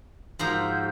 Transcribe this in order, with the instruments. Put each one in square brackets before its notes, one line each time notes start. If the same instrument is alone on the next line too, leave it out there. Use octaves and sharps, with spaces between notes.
[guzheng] G#2 F3 A#5 [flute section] F#4 E6 G6